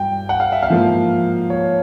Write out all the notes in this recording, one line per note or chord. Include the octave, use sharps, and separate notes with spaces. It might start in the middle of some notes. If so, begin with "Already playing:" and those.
Already playing: G2 G5
F#5
F5
E5
F5
G#2 F3 A#3
C#5